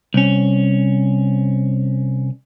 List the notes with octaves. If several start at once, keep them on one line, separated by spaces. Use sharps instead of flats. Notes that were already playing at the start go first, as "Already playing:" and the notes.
C2 C#4